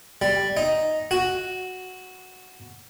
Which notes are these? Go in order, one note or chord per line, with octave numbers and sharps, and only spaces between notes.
G3
D#4
F#4